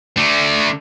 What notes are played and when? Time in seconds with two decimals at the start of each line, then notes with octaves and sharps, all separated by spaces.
0.17 D3 A3